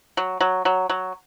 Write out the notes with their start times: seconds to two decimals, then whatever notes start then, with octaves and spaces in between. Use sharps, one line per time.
0.17 F#3
0.41 F#3
0.65 F#3
0.90 F#3